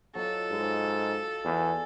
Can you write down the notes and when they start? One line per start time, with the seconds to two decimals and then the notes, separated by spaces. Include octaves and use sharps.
0.15 F#3 F4 A4 D#5
0.51 G#2
1.44 E2 D5 G#5